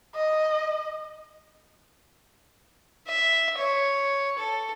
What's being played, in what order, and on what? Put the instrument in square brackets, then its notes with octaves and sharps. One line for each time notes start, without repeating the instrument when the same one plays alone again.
[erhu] D#5
[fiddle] E5
C#5
A4